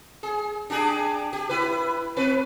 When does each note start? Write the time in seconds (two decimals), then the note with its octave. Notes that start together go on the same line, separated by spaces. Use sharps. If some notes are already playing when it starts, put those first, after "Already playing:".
0.23 G#4
0.70 D4 G4 G#4
1.33 G4
1.49 E4 B4
2.17 C4 B4